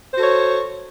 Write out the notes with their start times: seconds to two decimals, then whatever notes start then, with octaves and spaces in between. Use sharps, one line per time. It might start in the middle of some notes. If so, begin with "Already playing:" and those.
0.13 C5
0.16 F#4
0.19 A4
0.23 C#5